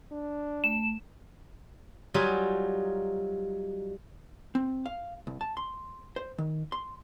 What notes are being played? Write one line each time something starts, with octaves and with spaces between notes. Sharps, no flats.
D4
A3 E7
F#3 G3 D#4 F4 G#5 B5
C4
F5
C2
A5
C6
C5
D#3
C6